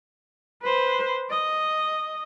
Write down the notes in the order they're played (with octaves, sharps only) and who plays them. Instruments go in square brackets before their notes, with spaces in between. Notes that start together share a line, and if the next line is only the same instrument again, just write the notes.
[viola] B4 C5
D#5